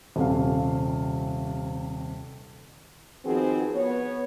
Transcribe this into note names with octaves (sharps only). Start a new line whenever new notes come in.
D#1 C3 F5
D#3 F3 B3 C4 F#4 G#4
B3 C#5